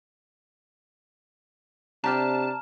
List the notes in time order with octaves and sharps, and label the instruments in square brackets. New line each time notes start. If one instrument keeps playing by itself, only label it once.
[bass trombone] C3 [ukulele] D4 G4 D5 [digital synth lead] A5 [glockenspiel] A#5 F6